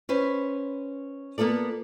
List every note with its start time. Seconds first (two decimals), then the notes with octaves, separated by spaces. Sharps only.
0.09 C#4 B4 C5
1.38 A#3 B3 F4 A4 D5